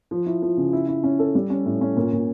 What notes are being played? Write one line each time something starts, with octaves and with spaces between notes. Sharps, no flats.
F3
E4
F3
C#3
E4
E4
C#4
A4
G3
C#4
A2
C#4
A#2
A#2